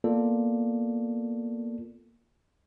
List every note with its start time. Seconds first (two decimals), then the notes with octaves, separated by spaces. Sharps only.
0.04 A#3 B3 F4 A4 D5